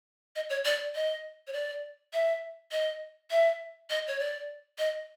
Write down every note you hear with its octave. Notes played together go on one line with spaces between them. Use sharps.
D#5
C#5
D5
D#5
C#5
D5
E5
D#5
E5
D#5
C#5
D5
D#5